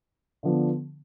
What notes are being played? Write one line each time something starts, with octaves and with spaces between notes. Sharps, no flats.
D3 F3 B3 D4